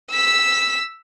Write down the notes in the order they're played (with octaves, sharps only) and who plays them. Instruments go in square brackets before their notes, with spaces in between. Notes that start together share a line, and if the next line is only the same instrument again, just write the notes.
[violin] E6 B6